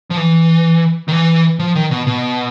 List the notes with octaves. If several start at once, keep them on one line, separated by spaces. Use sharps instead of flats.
F3
E3
D#3
E3
F3
D#3
B2
B2